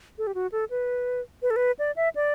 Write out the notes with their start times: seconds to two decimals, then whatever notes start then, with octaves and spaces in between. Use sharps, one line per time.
0.18 A4
0.27 G4
0.35 F#4
0.52 A4
0.70 B4
1.42 B4
1.50 A4
1.56 B4
1.79 D5
1.96 E5
2.15 D5